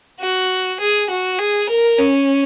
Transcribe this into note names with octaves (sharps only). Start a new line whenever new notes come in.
F#4
G#4
F#4
G#4
A#4
C#4